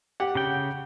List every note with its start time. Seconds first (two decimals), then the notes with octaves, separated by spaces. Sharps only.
0.20 G4 F#5
0.35 C#3 G5